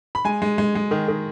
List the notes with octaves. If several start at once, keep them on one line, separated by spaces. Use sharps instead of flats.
B5
G#3 G#5
G#3
G#3
G#3
D#3
D#3